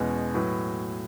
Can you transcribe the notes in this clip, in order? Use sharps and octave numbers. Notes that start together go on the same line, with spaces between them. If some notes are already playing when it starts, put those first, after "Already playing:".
Already playing: E2 B2 G#3 C#4
A2 F#3 B3 F#4